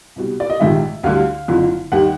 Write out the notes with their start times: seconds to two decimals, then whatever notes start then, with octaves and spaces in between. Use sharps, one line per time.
0.16 C2 B2 G3
0.40 D5
0.50 D#5
0.60 A#1 G#2 D#3 G3 E5
1.03 D2 D3 G3 F5
1.48 F#1 F2 D3 F3
1.92 D#2 D#3 G3 F#5